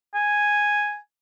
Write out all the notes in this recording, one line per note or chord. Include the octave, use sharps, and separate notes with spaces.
G#5